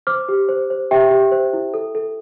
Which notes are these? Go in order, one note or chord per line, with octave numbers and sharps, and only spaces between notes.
C5 D6 F6
G4
C5
C5
G4 E5 G5
G4
C5
E4
A4
A4